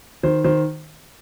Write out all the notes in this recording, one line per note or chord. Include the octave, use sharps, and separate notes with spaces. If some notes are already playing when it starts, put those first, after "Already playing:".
D#3 C5
D#3 C5